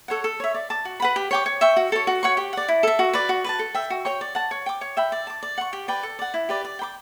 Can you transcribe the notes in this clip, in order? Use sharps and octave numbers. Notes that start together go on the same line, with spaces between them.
A4 C#5 F#5
A4
C#5 E5
D5
A5 D6
F#4
B4 F#5 B5
G4
C#5 G5 D6
C#5
E5 G5 C#6
F#4
A4 C#5
F#4
C#5 F#5 C#6
G4
D5 F#5
E4
A4 E5
F#4
B4 D5
F#4
B4 D5 A5
A4
E5 G5
F#4
C#5 G5 C#6
D5
F#5 A5
C#5
G5 D6
C#5
E5 G5 B5
D5
A5 D6
D5
F#5 C#6
G4
B4 D5 G5
A4
D5 F#5
E4
G4 B4 D5
D5
G5 B5 D6